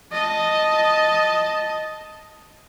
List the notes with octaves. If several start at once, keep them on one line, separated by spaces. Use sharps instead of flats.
D#5 A5